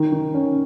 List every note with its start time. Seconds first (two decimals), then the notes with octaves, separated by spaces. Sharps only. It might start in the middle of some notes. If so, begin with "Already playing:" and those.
Already playing: D#3
0.12 D#3
0.34 C#4